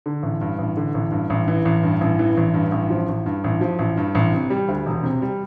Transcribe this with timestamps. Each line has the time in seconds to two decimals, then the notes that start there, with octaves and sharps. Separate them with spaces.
0.06 D3
0.23 A1
0.41 G2
0.58 A1
0.77 D3
0.94 A1
1.12 G2
1.30 A1
1.48 E3
1.65 A1
1.83 G2
2.01 A1
2.19 E3
2.37 A1
2.54 G2
2.72 A1
2.90 F3
3.08 A1
3.26 G2
3.44 A1
3.61 F3
3.79 A1
3.97 G2
4.15 A1
4.33 C3
4.50 G3
4.68 D2
4.86 E1
5.03 C3
5.22 G3